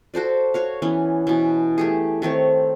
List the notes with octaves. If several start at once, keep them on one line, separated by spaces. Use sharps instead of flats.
F#4 A4 C5 D5
F#4 C#5 F5
E3 B3 C#4
B2 E3
A3 G4 G#4
D#3 A3 C4 C#5